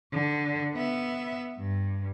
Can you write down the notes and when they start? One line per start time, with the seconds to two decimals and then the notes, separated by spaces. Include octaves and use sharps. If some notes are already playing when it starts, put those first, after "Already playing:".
0.13 D3
0.74 B3 E5
1.58 G2